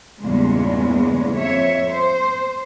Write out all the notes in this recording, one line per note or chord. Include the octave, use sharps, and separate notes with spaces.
E2 G2 A#2 C#3 G#3
F2 C#5 E5
C5